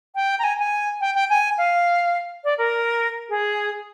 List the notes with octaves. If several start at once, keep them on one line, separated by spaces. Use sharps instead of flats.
G5
A#5
G#5
G#5
G5
G5
G#5
F5
D5
A#4
G#4